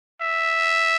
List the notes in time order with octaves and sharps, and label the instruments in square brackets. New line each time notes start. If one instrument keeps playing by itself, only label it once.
[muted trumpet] E5